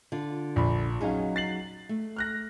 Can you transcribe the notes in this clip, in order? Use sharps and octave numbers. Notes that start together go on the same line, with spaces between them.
D3 F4
A#1 B5
F#3 C#4 D#4 G#4 F5
A6 C7 F#7
A3
F6 F#6 A#6